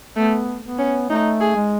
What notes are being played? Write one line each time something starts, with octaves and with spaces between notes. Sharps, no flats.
A3 B3
B3
C#4
A3 D#4
G#4
G#3